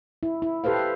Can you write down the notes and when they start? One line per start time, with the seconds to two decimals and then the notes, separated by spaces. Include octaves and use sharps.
0.23 E4
0.42 E4
0.64 G4 A4 B4 C5 F5